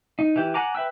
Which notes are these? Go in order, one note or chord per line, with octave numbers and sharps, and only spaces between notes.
D#4
E3 G4
F#5 G#5 A#5 D6
B4 E5 G5 E6